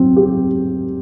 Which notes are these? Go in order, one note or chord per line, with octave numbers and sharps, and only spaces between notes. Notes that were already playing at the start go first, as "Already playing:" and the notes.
Already playing: F#3 C4
G4